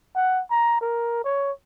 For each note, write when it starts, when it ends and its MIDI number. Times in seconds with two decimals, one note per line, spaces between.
0.15 0.42 78
0.51 0.78 82
0.81 1.23 70
1.24 1.52 73